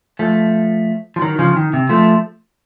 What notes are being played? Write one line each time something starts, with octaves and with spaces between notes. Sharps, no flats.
F3 A3
F3
D#3 F#3
C#3 F3
D#3
C3
F3 A3